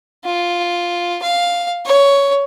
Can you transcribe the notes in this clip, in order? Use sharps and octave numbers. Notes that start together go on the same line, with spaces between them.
F4
F5
C#5